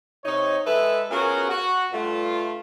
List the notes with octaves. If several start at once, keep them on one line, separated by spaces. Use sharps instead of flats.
C3 D#4 C#5
G#3 G#4 A4 B4 E5
B3 C#4 F4 F#4 G#4 A#4
F#4
G2 A3 F4